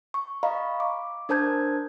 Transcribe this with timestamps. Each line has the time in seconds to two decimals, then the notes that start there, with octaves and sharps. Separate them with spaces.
0.14 C#6
0.43 D#5 F5 A#5 B5 C#6
0.80 D6
1.29 D4 A#4 C5 A5 G6 G#6